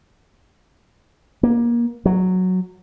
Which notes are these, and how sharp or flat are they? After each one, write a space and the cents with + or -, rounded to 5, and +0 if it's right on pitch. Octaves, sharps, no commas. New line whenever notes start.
A#3 +25
F#3 -5